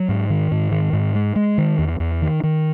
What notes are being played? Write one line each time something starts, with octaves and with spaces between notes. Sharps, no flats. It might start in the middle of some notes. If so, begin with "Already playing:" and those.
Already playing: F#3
G#2
D#3
G#2
D#3
G#2
G#3
G#3
D#3
E2
E2
D#3
D#3